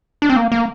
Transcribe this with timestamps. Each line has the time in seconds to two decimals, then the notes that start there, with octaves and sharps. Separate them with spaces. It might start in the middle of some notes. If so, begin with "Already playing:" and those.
0.22 D4
0.30 C4
0.36 A#3
0.52 A#3